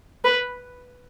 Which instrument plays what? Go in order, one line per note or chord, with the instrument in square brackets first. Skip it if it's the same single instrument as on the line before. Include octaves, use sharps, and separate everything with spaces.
[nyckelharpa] B4